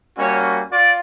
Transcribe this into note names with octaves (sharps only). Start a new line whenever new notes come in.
G3 A#3 C#4 F#4 C#5
F4 D5